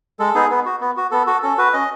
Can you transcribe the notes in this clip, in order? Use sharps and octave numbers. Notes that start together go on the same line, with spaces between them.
G#3 A4
B3 D#4 G#4
B3
F#4
B3
F#4
B3 A4
F#4 A4
C#4 A4
F#4 B4
C#4 D#5